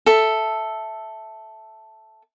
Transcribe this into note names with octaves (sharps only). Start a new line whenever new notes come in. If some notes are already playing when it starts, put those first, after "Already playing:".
A4 E5